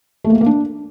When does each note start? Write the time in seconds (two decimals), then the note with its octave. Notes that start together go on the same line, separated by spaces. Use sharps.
0.24 A3
0.30 A#3
0.35 A3
0.41 A#3
0.46 D4